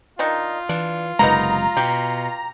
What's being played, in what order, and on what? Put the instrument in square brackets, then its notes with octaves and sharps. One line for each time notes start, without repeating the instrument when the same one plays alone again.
[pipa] D#3 D4 D#4 [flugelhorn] F4
[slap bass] E3 [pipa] D4
[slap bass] F#1 C3 G#3 [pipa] A#3 B3 D#4 [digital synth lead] A#5
[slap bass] B2 [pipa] G4